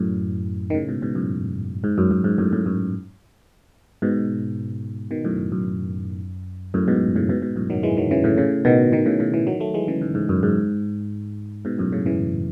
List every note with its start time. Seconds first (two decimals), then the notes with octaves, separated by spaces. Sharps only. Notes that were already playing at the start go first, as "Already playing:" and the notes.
Already playing: F#2 A2
0.70 D#3
0.74 A2 C#3
0.88 G#2 B2
1.02 G#2 B2
1.15 F#2 A2
1.84 G#2
1.98 F#2
2.11 F#2
2.24 G#2
2.38 F#2 A2
2.53 F#2 A2
2.66 F#2 A2
4.02 G#2 B2
5.11 B2 D#3
5.25 F#2 A2
5.52 F#2
6.74 F#2 A2
6.88 G#2 B2
7.16 A2 C#3
7.29 G#2 B2
7.42 G#2 B2
7.56 F#2 A2
7.70 D#3 F#3
7.83 E3 G#3
7.97 D#3 F#3
8.11 C#3 E3
8.24 A2 C#3
8.38 A2 C#3
8.65 B2 D#3
8.92 B2 D#3
9.06 A2 C#3
9.20 A2 C#3
9.34 C#3 E3
9.47 D#3 F#3
9.60 F#3 A3
9.74 E3 G#3
9.88 C#3 E3
10.01 G#2
10.15 G#2
10.29 F#2
10.43 G#2
11.65 G#2 B2
11.78 F#2 A2
11.92 A2 C#3
12.06 C#3 E3